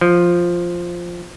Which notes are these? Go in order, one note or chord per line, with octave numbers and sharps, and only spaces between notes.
F3